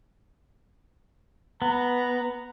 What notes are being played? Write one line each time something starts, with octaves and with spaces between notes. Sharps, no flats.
B3 A#5